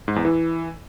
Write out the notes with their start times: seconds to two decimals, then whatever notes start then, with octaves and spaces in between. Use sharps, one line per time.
0.08 G#2
0.16 E2
0.25 E3